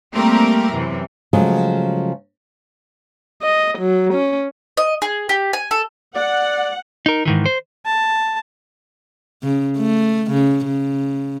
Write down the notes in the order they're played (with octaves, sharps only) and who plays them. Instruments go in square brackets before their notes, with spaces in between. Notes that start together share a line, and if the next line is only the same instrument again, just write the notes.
[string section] G3 A3 A#3 C4 G4 A#4
F#2 C3 E3
[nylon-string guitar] C#3 F3 F#3 G#3 A3
[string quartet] D#5
F#3
C#4
[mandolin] D#5
G#4
G4
G#5
A4
[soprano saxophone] D5 [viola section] F#5
[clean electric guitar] D#4 A#4
G#2 D#3 E3
C5
[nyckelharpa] A5
[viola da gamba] C#3
A3
C#3
C#3